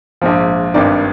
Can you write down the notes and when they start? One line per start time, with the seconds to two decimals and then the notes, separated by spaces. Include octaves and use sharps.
0.22 A#1 G#2 F3
0.74 G#1 G2 D#3 D5